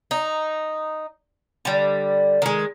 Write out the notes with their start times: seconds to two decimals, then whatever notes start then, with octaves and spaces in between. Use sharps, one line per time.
0.11 D#4
1.65 D3 G3
2.42 D#3 G#3